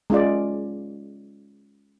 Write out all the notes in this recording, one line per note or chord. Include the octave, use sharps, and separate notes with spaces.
G#3 C#4 F4 D5